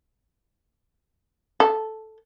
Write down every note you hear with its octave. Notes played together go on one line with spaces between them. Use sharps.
A4